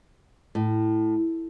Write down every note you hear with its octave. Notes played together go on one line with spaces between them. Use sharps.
A2